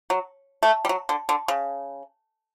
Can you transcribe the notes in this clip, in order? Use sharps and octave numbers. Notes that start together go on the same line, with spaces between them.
F#3
A3
G3
F#3
D3
D3
C#3